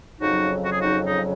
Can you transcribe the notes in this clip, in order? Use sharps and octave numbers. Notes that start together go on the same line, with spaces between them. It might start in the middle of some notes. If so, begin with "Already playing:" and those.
F2 C#3 F#3 D#4 F#4
F#4
G#4
D#4 F#4
D#4